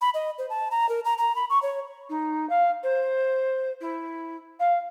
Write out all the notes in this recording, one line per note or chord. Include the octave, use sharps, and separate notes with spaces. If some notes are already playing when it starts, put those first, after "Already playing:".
B5
D#5
C5
A5
A#5
A#4
A#5
A#5
B5
C#6
C#5
D#4
F5
C5
E4
F5